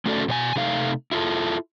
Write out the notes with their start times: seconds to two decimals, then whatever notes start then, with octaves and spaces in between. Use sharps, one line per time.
0.06 A3 C#4 F#4 A4 C5 D5
0.28 B2 C5 G#5
0.56 C3 A3 D#4 F5
1.12 E4 F4 A4